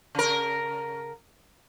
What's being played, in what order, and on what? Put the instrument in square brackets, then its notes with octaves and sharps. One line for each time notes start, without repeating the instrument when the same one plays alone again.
[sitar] C#3 A#4